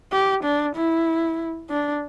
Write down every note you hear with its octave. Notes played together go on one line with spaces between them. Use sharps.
G4
D4
E4
D4